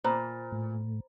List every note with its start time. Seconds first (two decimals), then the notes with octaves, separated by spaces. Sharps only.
0.04 A#2 C5 A#5 B5
0.52 A2